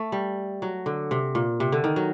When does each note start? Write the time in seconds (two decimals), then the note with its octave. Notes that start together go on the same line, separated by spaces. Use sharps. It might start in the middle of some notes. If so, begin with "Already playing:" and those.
Already playing: A3
0.12 G3
0.62 F#3
0.86 D3
1.11 C3
1.35 A#2
1.60 C3
1.72 D3
1.84 D#3
1.96 F#3